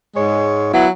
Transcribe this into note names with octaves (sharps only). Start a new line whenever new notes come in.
G#2 G#3 C#5
F#3 B3 E4